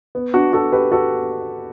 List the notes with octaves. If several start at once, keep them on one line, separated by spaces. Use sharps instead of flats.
B3
D4 F#4
F#4 A4
G4 B4
F#4 A4